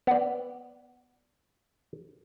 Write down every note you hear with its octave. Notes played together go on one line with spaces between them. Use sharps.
B3 D5